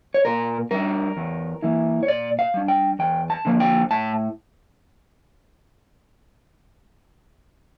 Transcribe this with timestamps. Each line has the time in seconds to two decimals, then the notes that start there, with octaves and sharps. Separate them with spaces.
0.14 C#5
0.25 A#2 A#4
0.71 G3 D4 A#4
1.17 E2
1.62 E3 A#3 E4
2.03 C#5
2.08 A#2 D5
2.39 F5
2.54 G3 D4
2.68 G5
2.99 E2 G5
3.30 A5
3.45 D3 F3 A#3
3.60 G5
3.91 A2 A5